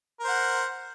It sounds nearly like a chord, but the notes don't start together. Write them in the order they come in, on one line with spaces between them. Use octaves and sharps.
A#4 C5 F#5